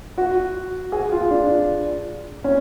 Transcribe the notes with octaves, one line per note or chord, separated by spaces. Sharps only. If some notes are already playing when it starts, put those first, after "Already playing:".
F#4
G#4
F4
D4
C#4